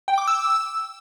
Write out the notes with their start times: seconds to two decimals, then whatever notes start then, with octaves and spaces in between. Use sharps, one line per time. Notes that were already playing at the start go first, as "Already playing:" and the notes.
0.08 G5
0.18 D6
0.28 E6